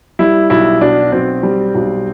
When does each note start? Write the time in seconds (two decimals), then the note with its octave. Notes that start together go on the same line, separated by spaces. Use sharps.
0.19 G3 E4
0.50 B1 E4
0.81 B2 D4
1.12 B1 C4
1.43 G3
1.75 B1